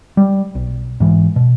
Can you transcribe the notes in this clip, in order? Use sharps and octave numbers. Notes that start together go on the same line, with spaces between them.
G3
B1
G#2 E3
B2